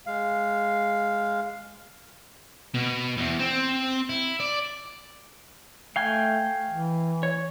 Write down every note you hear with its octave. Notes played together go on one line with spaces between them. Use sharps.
G#3 F5
B2
E2
C4
E4
D5
A3 F5 G5 G#5
E3
C#5